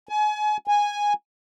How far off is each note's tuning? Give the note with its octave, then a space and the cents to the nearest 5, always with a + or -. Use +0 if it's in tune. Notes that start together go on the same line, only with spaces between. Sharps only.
G#5 +35
G#5 -5